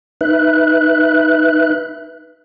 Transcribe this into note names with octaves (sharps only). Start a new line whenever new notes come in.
D#4 B4 E5 F#6